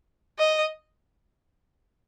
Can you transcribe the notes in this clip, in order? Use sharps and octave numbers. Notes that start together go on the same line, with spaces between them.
D#5